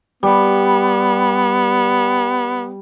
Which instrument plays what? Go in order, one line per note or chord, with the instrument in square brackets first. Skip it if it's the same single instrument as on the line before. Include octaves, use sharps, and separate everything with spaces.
[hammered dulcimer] G3 [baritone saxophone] B3